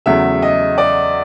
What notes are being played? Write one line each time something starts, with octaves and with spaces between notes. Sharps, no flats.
E2 C#3 F#3 A3 E5
D#5
D5